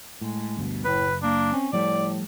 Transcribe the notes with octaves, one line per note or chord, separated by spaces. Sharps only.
A2 G#3
D2 G2 B2
F#1 A2 B4
A#3 D4
C4 C#4
A2 F3 G3 A3 D5